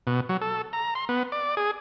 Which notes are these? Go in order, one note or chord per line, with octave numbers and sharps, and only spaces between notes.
B2
F#3
A4
A#5
C6
B3
D5
G#4